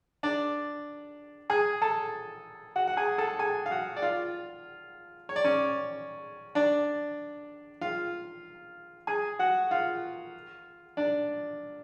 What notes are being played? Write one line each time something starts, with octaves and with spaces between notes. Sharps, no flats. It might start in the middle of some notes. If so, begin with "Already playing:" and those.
D4 D5
G#4 G#5
A4 A5
F#4 F#5
F#5
G#4 G#5
A4 A5
G#4 G#5
F5
F#4 F#5
D5
F4 F5
C#5
D5
C#4 C#5
D4 D5
F4 F5
G#4 G#5
F#4 F#5
F4 F5
D4 D5